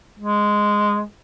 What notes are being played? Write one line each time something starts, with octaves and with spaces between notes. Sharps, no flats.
G#3